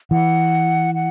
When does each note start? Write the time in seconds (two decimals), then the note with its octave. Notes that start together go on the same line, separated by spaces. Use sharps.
0.11 E3 F#5
0.95 F#5